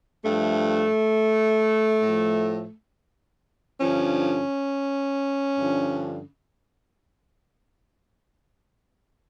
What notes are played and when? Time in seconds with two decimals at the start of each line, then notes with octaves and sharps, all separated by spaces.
0.24 G2 F3 A3
2.02 A2 F3
3.80 G2 D3 F3 C#4
5.59 G2 D3 F3